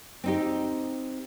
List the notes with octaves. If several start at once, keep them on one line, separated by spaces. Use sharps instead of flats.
C4 D#4 G4